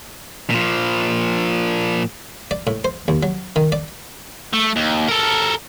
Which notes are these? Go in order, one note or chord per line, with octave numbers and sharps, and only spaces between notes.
A#2 F3
D5
A2
C5
D#2
F#3
D#3
D5
A3
D#2
A4 A#4